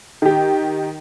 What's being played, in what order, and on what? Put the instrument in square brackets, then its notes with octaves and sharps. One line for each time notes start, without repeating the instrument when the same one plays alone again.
[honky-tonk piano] D#3 G4